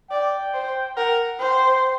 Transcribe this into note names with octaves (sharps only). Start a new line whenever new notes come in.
D5 G5
C5
A#4 F#5
C5 G5